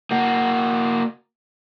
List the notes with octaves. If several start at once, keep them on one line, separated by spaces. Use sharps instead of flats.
A#3 F#4